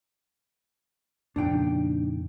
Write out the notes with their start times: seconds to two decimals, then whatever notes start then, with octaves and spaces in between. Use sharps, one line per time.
1.36 F2 A#2 C#3 D4 D#4 G5